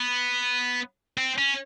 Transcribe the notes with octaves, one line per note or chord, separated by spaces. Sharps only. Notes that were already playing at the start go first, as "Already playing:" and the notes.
Already playing: B3
C4
C#4